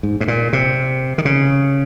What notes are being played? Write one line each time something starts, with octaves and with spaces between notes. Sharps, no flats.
G#2
G#2
A#2
C3
D#3
C#3